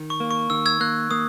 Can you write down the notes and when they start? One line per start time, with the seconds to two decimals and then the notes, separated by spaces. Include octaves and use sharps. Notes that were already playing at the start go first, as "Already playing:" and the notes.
Already playing: D#3
0.10 C#6
0.20 A#3
0.31 C#6
0.50 D#3 E6
0.66 E6 G#6
0.80 A#3 F#6
1.11 A#3 D#6